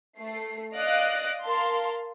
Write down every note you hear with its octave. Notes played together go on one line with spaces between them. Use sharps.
A3 C7
D5 D#5 F5 F#6 A#6 D7
A#4 F5 A5 C6